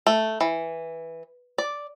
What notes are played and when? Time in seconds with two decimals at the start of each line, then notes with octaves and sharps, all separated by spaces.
0.07 A3
0.41 E3
1.58 D5